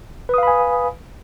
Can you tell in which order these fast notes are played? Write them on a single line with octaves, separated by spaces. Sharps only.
B4 D#6 F5 B5 G#5